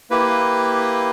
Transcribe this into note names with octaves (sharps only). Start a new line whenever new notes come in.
A#3 E4 G4 B4